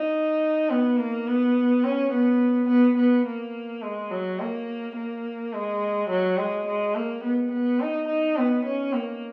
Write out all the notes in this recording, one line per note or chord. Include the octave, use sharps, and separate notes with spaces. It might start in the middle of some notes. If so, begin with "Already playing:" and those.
Already playing: D#4
B3
A#3
B3
C#4
B3
B3
B3
A#3
G#3
F#3
A#3
A#3
G#3
F#3
G#3
G#3
A#3
B3
B3
D#4
D#4
B3
C#4
A#3